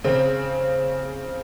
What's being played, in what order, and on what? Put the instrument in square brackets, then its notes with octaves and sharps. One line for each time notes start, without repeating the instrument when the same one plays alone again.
[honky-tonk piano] C#3 C4